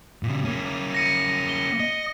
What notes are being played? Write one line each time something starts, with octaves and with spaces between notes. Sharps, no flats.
A#2 C#3
A#3 C#4
A#6 C#7 D#7
G7
D#5